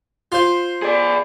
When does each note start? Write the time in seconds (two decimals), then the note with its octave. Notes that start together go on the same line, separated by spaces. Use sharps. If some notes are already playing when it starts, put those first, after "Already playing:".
0.32 F4 C5
0.82 G#4 D5